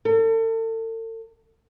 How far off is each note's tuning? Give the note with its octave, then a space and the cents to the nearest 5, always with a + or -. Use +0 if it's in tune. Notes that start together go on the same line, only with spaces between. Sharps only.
A4 +40